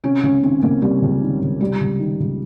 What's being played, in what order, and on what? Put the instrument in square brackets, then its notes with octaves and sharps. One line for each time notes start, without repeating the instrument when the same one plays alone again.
[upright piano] C3 [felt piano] C#4
[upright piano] C#2 [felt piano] C#4
[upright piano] D#3 [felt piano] C4
[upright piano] C#2 [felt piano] A#3
[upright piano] C3 [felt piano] G3
[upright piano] C#2
D#3
C#2
[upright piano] C3 [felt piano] G3
[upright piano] C#2
D#3
C#2